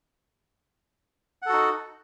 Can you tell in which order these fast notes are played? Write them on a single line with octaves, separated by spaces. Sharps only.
F#5 A4 F#4 D#4